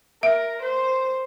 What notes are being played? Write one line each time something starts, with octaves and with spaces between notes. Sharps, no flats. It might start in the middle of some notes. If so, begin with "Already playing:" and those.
A#4 E5
C5